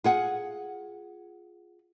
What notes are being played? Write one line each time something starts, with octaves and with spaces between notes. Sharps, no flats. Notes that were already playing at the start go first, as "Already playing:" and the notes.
F4 G#4 F#5